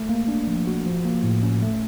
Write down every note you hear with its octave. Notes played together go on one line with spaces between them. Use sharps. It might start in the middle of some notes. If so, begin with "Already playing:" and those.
Already playing: A3
A#3
D4
F3
F#4
F3
A#3
A2
C#4
A3